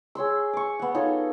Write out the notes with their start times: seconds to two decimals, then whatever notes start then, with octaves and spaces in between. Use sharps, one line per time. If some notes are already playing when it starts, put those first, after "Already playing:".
0.15 G#4 C#5 C6 E6
0.53 C#6 D6
0.79 B3 F#5
0.95 D#4 F4 A4 C#5